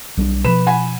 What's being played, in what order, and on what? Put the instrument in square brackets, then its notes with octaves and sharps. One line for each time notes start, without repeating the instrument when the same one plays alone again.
[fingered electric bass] B1 G3 D4
[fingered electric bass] B2 F3 [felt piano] B4 B5 E7
[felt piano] F#5 G#5 B5